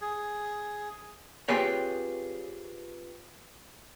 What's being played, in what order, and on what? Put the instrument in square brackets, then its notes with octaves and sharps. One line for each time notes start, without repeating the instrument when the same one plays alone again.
[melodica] G#4
[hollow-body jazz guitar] C4 F4 G4 G#4 B4 C#5